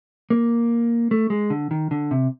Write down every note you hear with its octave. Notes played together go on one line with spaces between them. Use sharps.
A#3
A3
G#3
D3
D#3
D3
C3